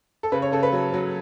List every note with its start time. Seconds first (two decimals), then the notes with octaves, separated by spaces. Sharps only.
0.23 A4
0.32 C#3 B4
0.42 C#5
0.52 C#3 A4
0.63 B4
0.72 F#3
0.94 F#3